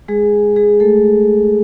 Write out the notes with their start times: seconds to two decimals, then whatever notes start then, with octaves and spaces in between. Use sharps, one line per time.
0.08 G#3 G#4
0.56 G#3 G#4
0.80 A3 A4